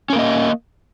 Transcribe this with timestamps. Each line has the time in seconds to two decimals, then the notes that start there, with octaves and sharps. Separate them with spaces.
0.10 C#4
0.13 A#4
0.16 A#3
0.19 D#5